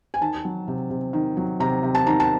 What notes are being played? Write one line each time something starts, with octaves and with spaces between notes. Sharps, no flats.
G#5
D#3 A5
F#3
C3
C3
D#3
F#3
C3 A#5
C3
A5
D#3 A#5
A5